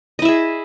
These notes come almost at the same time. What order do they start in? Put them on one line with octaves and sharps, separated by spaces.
D#5 E4 E5 G#4